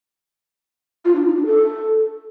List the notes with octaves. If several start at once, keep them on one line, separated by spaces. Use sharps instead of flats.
F4
D4
D#4
D4
A4